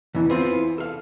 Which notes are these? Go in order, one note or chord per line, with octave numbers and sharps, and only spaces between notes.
E2 D3 E3
B3 C4 F4
A4 F5